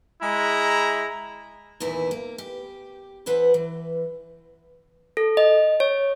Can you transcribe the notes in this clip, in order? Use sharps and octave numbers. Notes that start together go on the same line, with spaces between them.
G#3 E4 A#5
E2 A#2 D#3 E3 E4
A#3
G4
E2 E4 B4 C5 F#5
E3
A4
D#5
C#5